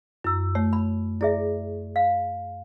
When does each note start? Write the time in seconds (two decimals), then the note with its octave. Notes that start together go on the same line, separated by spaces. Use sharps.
0.24 F#2 E4 E6
0.55 A3 C#5
0.73 B5
1.21 E4 G#4 D5 E5
1.96 F5